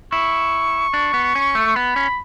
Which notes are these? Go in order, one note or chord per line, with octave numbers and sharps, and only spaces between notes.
E4 C#6
D4
B3
C#4
A3
B3 B5
C#4